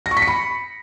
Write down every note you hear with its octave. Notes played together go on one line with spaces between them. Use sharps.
A#6
C#6
B6
C#7
B5